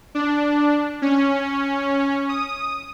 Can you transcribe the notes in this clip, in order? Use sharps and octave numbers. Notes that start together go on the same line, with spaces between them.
D4
C#4
D#6